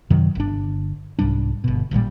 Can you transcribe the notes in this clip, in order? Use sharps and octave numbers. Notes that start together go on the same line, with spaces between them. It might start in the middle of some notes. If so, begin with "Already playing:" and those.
F#2 C3 D#3 F#3
G1 D4
C2 G#2 G3 D4
G1 B2
A1 A#2 E3 G3